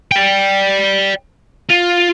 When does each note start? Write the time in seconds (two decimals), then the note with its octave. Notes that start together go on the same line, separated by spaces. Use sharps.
0.11 D5 G5
1.69 F4